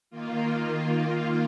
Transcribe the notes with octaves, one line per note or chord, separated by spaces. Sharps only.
D#3 A#3 F4